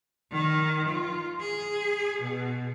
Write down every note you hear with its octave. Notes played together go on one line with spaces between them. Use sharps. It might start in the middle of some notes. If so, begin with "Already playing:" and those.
D#3
F4
G#4
B2